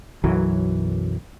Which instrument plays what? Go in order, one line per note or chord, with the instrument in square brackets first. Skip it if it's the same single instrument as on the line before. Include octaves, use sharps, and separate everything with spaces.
[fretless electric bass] B1 F#2 E3 F#3